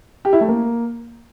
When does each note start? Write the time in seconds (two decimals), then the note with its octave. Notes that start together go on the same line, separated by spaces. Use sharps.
0.25 G4
0.33 E4
0.41 A3
0.48 A#3